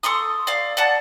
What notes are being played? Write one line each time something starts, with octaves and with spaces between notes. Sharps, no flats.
A4 C6 C#6 D#6
D5 F5
D5 F#5 A5